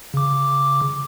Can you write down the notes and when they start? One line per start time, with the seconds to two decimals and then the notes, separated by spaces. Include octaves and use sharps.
0.14 C#3 D6